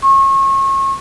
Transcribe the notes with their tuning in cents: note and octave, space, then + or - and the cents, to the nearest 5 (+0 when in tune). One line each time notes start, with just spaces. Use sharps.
C#6 -35